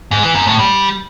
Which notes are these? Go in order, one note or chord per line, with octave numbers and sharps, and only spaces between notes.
G#2
E3
F#2
A2
G3